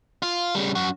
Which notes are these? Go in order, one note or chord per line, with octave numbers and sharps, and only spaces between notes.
F4
C#3 G3
F#2 F#4